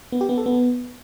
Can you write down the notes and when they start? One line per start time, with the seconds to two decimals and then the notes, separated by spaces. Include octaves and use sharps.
0.12 B3
0.21 G4
0.29 B3
0.38 A4
0.46 B3